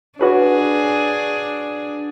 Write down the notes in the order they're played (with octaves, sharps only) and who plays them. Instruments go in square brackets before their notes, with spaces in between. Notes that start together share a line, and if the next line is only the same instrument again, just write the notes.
[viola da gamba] D4 G#4 [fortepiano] F#4 B4 C#5